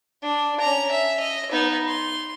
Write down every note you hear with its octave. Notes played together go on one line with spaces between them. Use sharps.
D4
C#4 A#5
E5
D#5
B3 D#4
C6